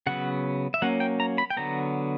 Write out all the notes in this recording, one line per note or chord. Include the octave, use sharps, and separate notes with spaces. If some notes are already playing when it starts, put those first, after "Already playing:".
C#3 F#3 B3 F#5
E5
F#3 A#3 C#4 F#5
G5
A#5
B5
G5
D3 F#3 B3 A#5